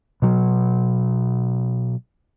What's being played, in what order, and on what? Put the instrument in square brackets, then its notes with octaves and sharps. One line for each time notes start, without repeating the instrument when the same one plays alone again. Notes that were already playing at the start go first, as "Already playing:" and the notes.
[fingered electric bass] B2 F#3